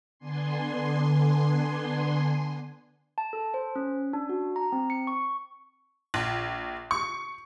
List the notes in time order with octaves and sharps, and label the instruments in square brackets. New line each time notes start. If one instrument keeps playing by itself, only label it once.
[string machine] D3 B3 D4 G#5 C6
[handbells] A5
A4
C5
C#4
D4
F#4
A#5
C4
C#7
C#6
[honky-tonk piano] A#1
C#6